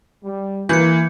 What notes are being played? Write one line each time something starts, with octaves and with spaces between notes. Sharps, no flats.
G3
E3 A#3 G6 C#7